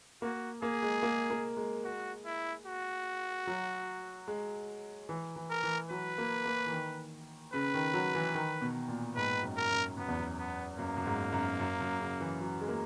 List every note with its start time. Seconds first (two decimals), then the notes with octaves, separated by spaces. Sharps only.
0.22 A#3 F#4
0.62 A#3 G#4
0.83 G#3
1.03 A#3
1.30 A#3
1.57 G#3
1.84 F#4
2.25 E4
2.66 F#4
3.47 F#3
4.28 G#3
5.09 E3
5.36 E3
5.50 A#4
5.63 E3
5.90 F#3 B4
6.18 A#3
6.45 A#3
6.67 E3
6.72 D#3
7.54 C#3 B4
7.74 D#3
7.94 F#3
8.15 E3
8.35 D#3
8.61 B2
8.88 A#2
9.16 G#2 B4
9.43 F#2
9.57 A#4
9.70 F#2
9.97 F#2 B3
10.08 E2
10.18 F#2
10.38 B3
10.79 F#2 A#3
10.97 F#2
11.06 G#2
11.33 F#2
11.60 F#2
11.81 F#2
12.00 C#3
12.21 E3
12.41 F#3
12.61 G#3
12.68 A#3